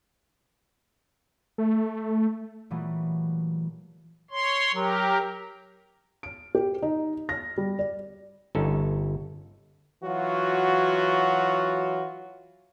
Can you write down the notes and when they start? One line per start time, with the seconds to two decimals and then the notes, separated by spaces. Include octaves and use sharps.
1.58 A3
2.70 A#2 E3 F#3 G3 A3 B3
4.31 C#5 C6
4.74 F#3 G4 A#4
6.23 D7
6.55 G4
6.82 D#4
7.29 A#6
7.58 G3
7.79 D5
8.55 G1 C#4 D#4 A4
10.03 E3 F#3 F4 F#4